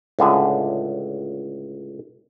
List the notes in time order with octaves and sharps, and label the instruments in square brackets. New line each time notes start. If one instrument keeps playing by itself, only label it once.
[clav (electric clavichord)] C#2 A2 D3 G#4 E5